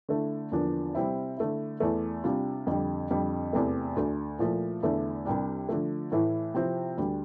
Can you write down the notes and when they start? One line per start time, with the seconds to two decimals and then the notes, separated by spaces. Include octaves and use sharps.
0.09 D3 A3 E4
0.52 E2 D3 F3 A#3 D4
0.95 C3 G3 C4 E4
1.37 D3 A3 E4
1.80 E2 E3 A3
2.24 C3 G3 D4 F4
2.67 F2 D3 G3
3.11 F2 D3 G3
3.53 E2 C3 E3 A3
3.96 D2 D3 A3
4.39 A#2 F3 A3 E4
4.83 E2 D3 A3 E4
5.25 C2 C3 G3 D4
5.69 D3 F3 A3
6.12 A2 E3 A3 E4
6.54 C3 F3 C4 E4
6.98 D2 D3 G3